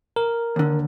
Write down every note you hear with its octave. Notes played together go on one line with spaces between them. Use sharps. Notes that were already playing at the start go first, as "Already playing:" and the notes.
A#4
D#2 D3